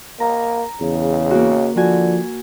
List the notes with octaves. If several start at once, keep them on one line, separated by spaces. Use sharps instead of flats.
A#3 A#5
E2 C#3
A#3 F#4
D3 F3 F#4 G#5